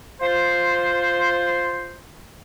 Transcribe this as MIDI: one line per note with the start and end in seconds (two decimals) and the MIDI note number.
0.21 1.97 65
0.21 1.97 72